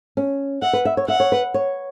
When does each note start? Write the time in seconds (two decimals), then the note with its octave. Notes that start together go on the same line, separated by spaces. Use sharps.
0.17 C#4
0.62 E5 F#5
0.73 B4
0.85 E5
0.97 C#5
1.08 E5 F#5
1.20 C#5
1.32 B4
1.54 C#5